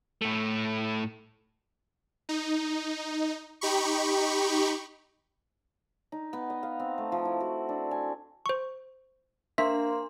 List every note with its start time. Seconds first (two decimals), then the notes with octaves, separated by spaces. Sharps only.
0.22 A2 A3
2.29 D#4
3.61 D#4 G4 B5 C#6
6.12 D#4
6.33 B3
6.50 D#5
6.63 F5
6.79 C4
6.98 A3
7.12 F3
7.25 E4
7.40 F#4
7.69 D4
7.91 G#5
8.46 C5 C#6
9.58 A#3 D4 E5 C6